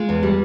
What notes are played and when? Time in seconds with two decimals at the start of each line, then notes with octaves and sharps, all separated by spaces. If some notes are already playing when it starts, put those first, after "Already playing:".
Already playing: G#3 F4
0.09 E2
0.23 G3